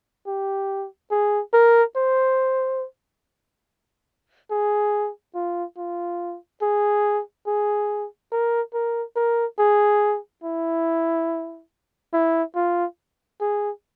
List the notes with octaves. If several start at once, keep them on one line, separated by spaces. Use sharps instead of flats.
G4
G#4
A#4
C5
G#4
F4
F4
G#4
G#4
A#4
A#4
A#4
G#4
E4
E4
F4
G#4